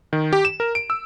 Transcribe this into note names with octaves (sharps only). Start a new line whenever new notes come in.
D#3
G4
E7
A#4
D7
E6